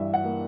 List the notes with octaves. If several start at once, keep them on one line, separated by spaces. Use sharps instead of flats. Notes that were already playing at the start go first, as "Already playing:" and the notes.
Already playing: G2 E3 G3 E5
F#5
A#3